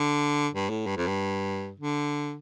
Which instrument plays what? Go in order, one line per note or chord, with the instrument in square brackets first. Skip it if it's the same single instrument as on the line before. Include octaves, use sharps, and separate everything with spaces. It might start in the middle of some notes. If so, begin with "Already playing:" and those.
Already playing: [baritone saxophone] D3
G2
A2
G2
F2
G2
D3